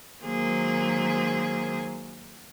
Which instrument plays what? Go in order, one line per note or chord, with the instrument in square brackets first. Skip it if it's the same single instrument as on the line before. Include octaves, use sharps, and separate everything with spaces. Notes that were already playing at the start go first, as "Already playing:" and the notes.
[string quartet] D#3 F#3 G#3 A#3 G#4 C5